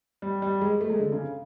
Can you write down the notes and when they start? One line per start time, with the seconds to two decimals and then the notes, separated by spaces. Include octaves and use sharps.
0.22 G3
0.42 G3
0.61 G#3
0.81 A3
0.90 G#3
0.99 D3
1.12 C#3